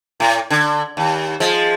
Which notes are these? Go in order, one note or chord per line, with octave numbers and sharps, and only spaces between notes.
A2
D3
D#2
F3 G#3